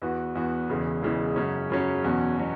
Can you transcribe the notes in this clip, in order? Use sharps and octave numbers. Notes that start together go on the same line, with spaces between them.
E2 E3 B3 F#4
E2 E3 B3 F#4
E1 E2 C#3 E3
E1 E2 C#3 E3
F#2 C#3 F#3 C#4
F#2 C#3 F#3 C#4
E2 B2 F#3 C#4 F#4
B2 F#3 C#4 F#4